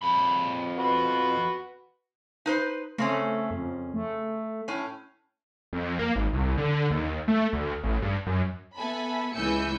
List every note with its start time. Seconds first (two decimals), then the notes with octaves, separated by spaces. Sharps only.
0.02 F2 B5
0.79 F#4 B4
2.46 D#4 B4 C5
2.98 C#3 A3 C4 C#4
3.51 F2
3.94 A3
4.68 A2 C#4
5.73 F2
5.99 A#3
6.16 G#1
6.33 C2
6.58 D3
6.90 D#2
7.28 A3
7.53 D2
7.84 A1
8.02 G2
8.27 F#2
8.76 B3 A4 E5 G#5 A5 B5
9.33 C#2 E3 G#5 E6 G6 C#7